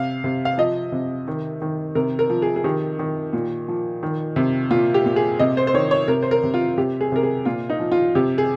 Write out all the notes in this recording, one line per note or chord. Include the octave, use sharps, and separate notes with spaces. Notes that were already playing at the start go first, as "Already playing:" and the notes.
Already playing: C3 F5
C3
F5
F3 D#5
C3
D#3
D#3
C3 A#4
A#4
F3
G#4
G#4
D#3 G4
D#3
A#2
F3
D#3
C3
A#2 F4
G4
A#2
G#4
C3 D#5
C5
C5
D#3 C#5
C#5
C3 A#4
C5
A#4
C3
F4
C3 G4
G#4
C3 A#4
G#4
A#2 F4
D#4
F3
F4
C3 G4
G#4